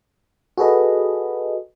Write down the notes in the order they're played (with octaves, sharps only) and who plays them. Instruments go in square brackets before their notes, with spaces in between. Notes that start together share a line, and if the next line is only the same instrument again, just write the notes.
[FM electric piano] F#4 G#4 A4 B4 D#5